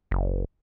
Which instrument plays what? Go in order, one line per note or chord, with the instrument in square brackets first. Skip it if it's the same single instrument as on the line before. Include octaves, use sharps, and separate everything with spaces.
[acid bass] F#1